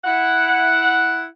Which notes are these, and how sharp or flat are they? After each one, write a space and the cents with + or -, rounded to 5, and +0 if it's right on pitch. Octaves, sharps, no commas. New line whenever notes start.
E4 +0 F#5 +0